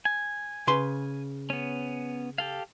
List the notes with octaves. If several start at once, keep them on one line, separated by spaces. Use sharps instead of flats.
G#5
C#3 B4 C6
B3 C#4
G4 A4 F5